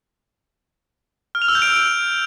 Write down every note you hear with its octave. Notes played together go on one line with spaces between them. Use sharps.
F6
F7
E6
G6
D7